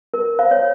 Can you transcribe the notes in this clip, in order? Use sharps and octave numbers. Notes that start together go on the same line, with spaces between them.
A#4
C5 F5
C#5